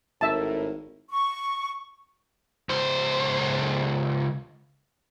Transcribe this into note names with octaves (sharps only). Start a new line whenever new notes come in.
G#1 A2 A#4 E5 A5
C#6
C#2 C5